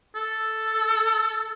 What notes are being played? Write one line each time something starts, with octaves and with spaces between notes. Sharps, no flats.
A4